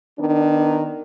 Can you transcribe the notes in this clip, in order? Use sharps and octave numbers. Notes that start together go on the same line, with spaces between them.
D#3 B3 D4